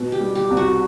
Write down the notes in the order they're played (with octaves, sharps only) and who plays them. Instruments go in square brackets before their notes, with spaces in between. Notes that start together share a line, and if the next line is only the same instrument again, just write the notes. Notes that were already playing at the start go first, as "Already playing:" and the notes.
Already playing: [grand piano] B2
[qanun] G4
[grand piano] G3
[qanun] G4
[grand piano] C2
[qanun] F#4